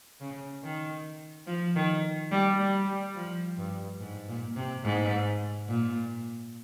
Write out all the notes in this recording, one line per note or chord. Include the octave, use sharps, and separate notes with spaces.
C#3
D#3
F3
D#3
G3
G3
G3
F3
G2
G#2
A#2
C3
G#2
A#2